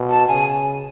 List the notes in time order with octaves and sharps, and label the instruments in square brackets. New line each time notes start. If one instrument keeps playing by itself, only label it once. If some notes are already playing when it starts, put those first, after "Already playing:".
Already playing: [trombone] B2
[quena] A5
[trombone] C#3 [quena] G#5